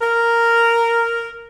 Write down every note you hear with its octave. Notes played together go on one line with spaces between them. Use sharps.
A#4